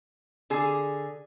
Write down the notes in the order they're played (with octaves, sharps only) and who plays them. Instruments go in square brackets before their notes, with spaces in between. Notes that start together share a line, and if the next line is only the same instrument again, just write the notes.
[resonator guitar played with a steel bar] D3 G#4